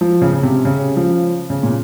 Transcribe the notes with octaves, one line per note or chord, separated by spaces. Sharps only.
F3
C#3
C#3
C3
C#3
F3
C#3
A#2